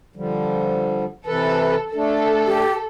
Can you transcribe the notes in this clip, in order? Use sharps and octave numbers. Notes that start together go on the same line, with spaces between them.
D3 F3 G3
C3 E3 A4 B4
A3 D4 A4
G4